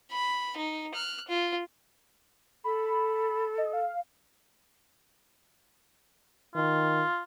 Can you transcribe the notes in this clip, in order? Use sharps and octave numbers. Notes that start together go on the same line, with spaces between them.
B5
D#4
F6 F#6
F4
A4 B5
B5
D#5
F5
D#3 F4